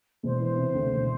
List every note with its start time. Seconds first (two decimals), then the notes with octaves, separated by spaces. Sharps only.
0.23 E1 C5
0.40 E3
0.57 C3
0.74 D2
0.92 E1